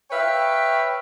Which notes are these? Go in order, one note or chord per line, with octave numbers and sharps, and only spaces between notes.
B4 C#5 E5 F5 G5